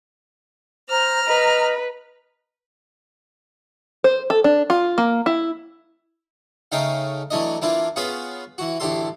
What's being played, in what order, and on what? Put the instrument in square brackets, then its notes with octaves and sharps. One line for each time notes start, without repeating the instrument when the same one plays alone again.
[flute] C5 [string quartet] A#5 F6
[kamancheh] B4 [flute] D#5
[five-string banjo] C5
A4
D4
F4
A#3
E4
[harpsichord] C#3 A3 C#4 D#4 F5 G5
E3 F#3 A3 D4 D#5
E3 A#3 D4 E4 F4
B3 C#4 F4 G#4 B4 F5
E3 F#4
A1 D2 A2 G4 A4 C6